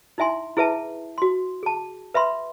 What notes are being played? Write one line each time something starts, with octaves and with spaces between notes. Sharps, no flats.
D#4 E4 E5 G#5 C6
E4 G#4 B4 E5 A5
F#4 C6
G#4 A5
B4 E5 B5 C6